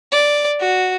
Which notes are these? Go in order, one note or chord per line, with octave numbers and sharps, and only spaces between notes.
D5
F#4